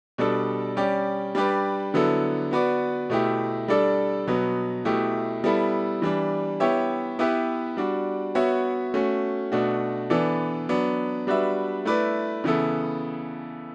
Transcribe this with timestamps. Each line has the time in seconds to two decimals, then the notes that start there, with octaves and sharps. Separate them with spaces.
0.18 B2 G3 D4 A4
0.76 G3 C#4 G4 D5
1.35 G3 D4 G4 B4 D5
1.94 D3 F#3 B3 E4 A4
2.51 B3 F#4 B4 D5
3.10 B2 A3 E4 G4
3.68 G3 D4 A4 D5
4.27 B2 F#3 B3
4.85 B2 A3 E4 G4
5.44 G3 B3 E4 A4
6.02 E3 G3 D4
6.60 B3 E4 G4 C#5 E5
7.19 B3 E4 G4 B4 E5
7.77 G3 D4 F#4
8.35 B3 F#4 C#5 E5
8.94 A3 C#4 F#4
9.52 B2 A3 D4 F#4
10.10 E3 B3 D4 A4 D5
10.69 F#3 B3 D4
11.27 G3 D4 F#4 B4 E5
11.85 A3 E4 B4 D5
12.44 C#3 E3 B3 E4 A4